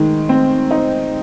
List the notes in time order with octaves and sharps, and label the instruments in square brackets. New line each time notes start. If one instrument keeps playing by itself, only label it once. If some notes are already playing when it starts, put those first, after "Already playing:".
Already playing: [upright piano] D#3 G#3 D#4
C4
D#4